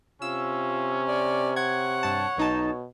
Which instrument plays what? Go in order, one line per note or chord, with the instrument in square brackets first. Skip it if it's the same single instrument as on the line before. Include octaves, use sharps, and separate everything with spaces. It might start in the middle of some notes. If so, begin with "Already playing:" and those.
[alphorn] C3 [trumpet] C#4 [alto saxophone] F4 [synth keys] E6
[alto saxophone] D5
[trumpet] C#5 [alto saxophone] F#5 [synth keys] G#6
[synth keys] G2 A5
[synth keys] B1 D#4 A5 [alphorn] B2